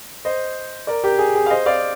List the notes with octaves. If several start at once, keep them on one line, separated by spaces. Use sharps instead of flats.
C5 D#5
A#4 D5
G4 A#4
G#4
G#4
F5
C5 D#5
D5 F5